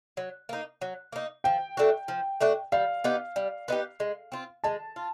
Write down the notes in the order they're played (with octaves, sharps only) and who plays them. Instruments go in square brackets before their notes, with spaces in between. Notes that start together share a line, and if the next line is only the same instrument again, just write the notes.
[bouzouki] F#3
A#3 D#4
F#3
A#3 D#4
[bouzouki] F3 [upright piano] G5
[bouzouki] A3 D4 F#4
F3
A3 D4 F#4
[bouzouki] G3 [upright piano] F5
[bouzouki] B3 D#4 G4
G3
B3 D#4 G4
G#3
C4 F4
[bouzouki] G#3 [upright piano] A5
[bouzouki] F4